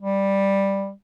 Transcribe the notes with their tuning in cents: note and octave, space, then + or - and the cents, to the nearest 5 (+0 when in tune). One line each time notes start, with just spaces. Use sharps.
G3 +5